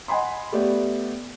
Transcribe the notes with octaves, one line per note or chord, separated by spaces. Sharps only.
D#5 F#5 G#5 B5 C6
A3 B3 G4 D5